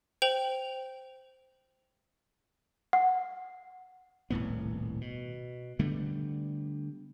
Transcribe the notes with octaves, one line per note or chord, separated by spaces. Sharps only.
C5 G5 F7 F#7
F#5
D#1 C2 A2 B3
B2
D3 G3 A3 B3